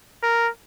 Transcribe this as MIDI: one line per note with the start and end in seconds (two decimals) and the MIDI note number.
0.23 0.49 70